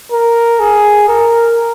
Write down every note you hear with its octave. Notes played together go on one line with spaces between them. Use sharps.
A#4
G#4
A#4